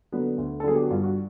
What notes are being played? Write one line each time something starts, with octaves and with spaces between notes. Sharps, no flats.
D3 F#3 B3
D2
A4
D3 F#3 B3 G#4
G4
F#4
G2 F4
F#4